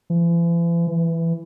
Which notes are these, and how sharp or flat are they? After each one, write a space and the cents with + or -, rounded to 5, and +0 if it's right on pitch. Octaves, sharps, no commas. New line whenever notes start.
E3 +45
E3 +10